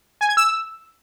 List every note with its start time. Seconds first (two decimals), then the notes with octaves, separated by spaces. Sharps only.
0.21 G#5
0.29 G#6
0.37 E6